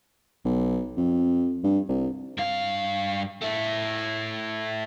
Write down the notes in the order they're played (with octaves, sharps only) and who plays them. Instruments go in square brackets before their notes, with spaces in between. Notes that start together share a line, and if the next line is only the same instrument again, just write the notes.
[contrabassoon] B1
F2
G2
C2
[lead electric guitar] G2 F5
A3 E4